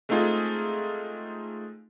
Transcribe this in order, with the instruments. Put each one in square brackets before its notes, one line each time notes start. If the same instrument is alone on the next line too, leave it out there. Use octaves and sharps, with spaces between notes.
[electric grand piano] G#3 A3 C4 D#4 F4 G#4